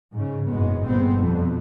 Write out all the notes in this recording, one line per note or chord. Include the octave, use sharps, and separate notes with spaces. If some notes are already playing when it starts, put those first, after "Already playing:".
G#2 C#3
F#1 G#2 B2 G#3 B3
G1 A#2 G#3 B3 C4
F2 B2 D3